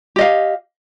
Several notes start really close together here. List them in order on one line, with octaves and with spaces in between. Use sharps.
G4 D#5 F5